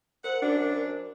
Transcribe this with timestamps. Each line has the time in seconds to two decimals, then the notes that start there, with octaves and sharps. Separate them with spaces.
0.24 A#4 C5 F#5
0.42 F#2 D4